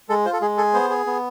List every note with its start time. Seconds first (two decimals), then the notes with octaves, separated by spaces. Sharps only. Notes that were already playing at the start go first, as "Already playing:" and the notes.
0.09 G#3 A4
0.25 F4 C5
0.33 A4
0.42 G#3 G#4
0.57 G#4 A4
0.74 B3 C5
0.90 G#4
1.06 B3